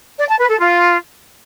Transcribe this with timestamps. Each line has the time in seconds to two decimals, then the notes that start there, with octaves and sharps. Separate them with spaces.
0.18 D5
0.29 A5
0.39 B4
0.49 A4
0.60 F4